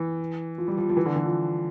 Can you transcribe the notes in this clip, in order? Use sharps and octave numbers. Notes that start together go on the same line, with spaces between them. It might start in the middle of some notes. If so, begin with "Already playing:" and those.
Already playing: E3
F3
G3
F3
F3
E3
D3
E3
F3